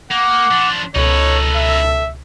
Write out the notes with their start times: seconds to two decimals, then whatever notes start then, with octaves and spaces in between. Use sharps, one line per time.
0.11 A#3 F#5 D6
0.51 F3 D4
0.95 C#2 B2 D#4 A4 B4 C#5
1.56 E5